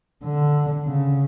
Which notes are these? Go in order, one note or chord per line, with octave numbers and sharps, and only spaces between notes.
D3
C#3